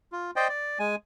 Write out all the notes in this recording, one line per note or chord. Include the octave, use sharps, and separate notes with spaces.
F4
C5 D5 D#5 G5
D5
G#3 G#5